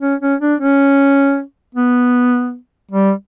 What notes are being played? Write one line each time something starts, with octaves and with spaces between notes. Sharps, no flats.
C#4
C#4
D4
C#4
B3
G3